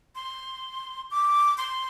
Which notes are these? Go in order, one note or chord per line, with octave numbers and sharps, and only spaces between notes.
C6
D6
C6